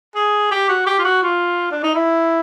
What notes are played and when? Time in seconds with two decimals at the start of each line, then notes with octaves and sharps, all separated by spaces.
0.15 G#4
0.51 G4
0.69 F#4
0.87 G4
0.99 F4
1.05 F#4
1.23 F4
1.71 D4
1.83 D#4
1.95 E4